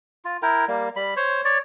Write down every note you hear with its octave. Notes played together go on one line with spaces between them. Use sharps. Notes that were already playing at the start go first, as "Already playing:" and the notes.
F4
E4 A#4 G5
G3 A#3
G3 B5
C5 C#5
C#5 D5